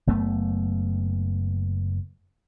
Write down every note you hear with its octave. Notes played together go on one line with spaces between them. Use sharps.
F#1 F#2 A3 B3